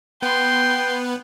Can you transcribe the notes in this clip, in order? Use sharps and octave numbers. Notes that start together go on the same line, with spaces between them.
B3 B4 G5 C6